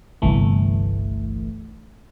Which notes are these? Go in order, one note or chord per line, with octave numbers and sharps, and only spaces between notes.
G1 C2 E3 A3